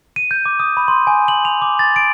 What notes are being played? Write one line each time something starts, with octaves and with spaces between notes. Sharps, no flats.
D#7
G6
D6
D#6
B5
C6
G#5
F#7
F7
D6
A6
D7